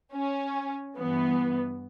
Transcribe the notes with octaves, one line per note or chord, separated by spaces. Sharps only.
C#4
G2 E3 B3